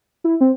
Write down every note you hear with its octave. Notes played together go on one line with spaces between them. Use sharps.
E4
C4